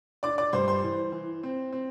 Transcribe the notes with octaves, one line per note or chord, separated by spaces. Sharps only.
D4 D5 D6
D5 D6
G2 C5 C6
C5 C6
E3
E3
C4
C4